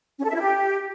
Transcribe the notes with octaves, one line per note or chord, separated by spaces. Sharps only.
C#4
A4
E5
E4
G4